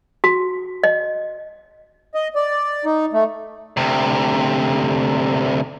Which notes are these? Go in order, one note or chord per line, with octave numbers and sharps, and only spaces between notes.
F#4
D#5
D#5
D5
D#4
A3
D2 C3